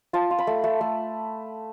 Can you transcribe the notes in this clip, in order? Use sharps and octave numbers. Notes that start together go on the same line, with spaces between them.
F4 A5
F4
B5
A3
A3
A3